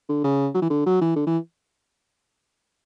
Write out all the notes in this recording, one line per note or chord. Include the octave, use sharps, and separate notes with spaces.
D3
C#3
F#3
E3
D3
F#3
E3
D3
E3